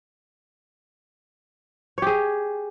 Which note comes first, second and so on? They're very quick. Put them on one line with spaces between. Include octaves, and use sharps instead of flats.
C#5 G4 G#4